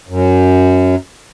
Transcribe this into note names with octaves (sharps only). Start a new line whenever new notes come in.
F#2